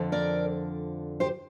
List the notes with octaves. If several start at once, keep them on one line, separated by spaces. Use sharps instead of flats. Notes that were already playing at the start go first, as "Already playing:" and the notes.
Already playing: F2 D3 F3
A#4 D5
G4 C5